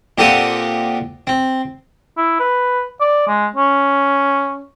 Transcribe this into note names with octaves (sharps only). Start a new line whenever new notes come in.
A#2 C4 G4 A4 F#5 D#6
C4
E4
B4
D5
G#3
C#4